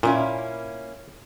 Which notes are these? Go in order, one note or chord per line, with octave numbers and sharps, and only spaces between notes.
A#2 A#3 C#4 E4